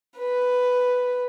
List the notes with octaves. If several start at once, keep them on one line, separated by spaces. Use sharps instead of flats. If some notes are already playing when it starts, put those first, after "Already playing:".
B4